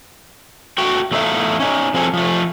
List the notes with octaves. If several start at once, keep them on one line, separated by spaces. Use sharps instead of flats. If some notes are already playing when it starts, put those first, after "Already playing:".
A3 F#4 G5
E2 A3 D#4 A4 E5 F5
C#4 D#4
F3 C4 G#4 A4
F3 A3